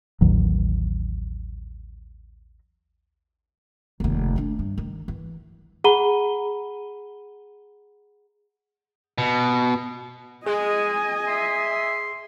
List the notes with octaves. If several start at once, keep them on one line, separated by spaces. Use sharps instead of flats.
A1 D#2 D#3 F#3
F1 D#2
A3 D4
G2
D#3
E3
G#4 F#5 A#5 B5 D#7 G7
B2
G#3 G#4 D#5 G#5
E5 C6